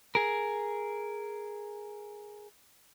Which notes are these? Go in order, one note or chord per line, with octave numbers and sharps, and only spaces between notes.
G#4 A#4